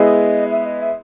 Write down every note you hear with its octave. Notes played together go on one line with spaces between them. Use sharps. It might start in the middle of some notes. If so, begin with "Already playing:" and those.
Already playing: G#3 B3 E4 G#4 D#5
E5
D#5
E5